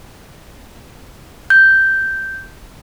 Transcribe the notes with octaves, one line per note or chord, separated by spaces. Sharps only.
G6